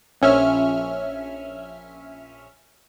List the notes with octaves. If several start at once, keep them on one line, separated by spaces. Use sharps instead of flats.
A#1 C#4 E5 F6